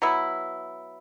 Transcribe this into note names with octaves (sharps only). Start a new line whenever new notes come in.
F#3 B3 E4